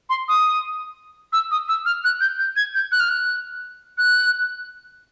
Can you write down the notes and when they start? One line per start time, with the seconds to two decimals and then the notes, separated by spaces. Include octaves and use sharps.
0.09 C6
0.28 D#6
1.33 E6
1.51 D#6
1.68 E6
1.85 F6
2.04 F#6
2.21 G6
2.39 G6
2.56 G#6
2.74 G6
2.92 F#6
3.00 F6
3.09 F#6
3.98 F#6